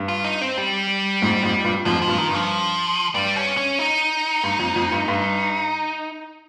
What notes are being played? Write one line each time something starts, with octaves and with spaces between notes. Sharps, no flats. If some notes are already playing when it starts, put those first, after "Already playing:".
Already playing: G2
F4
D#4
C4
G3
F2 G#2
F2 G#2
G2 A#2
F2 G#2 F3
F3
G2 A#2
D#3
G2
F3
G2 G3
C#4
C#4
D#4
G2
F2
F2
G2
G2